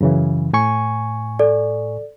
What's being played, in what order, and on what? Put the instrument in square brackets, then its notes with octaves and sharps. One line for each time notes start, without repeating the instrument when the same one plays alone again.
[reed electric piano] F#2 C#3 E3
A2 G#5 C#6
[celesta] A4 D5